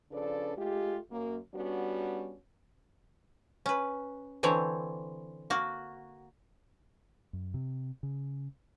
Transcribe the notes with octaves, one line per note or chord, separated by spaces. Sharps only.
C#3 F3 D4 A4 B4 D5
G#3 A3 F4 G4
F#2 A#3
G3 B3 C#4 D4 F#4
C#4 B4
D3 E3 C4 C#5
A#3 F#4
F#2
C3
C#3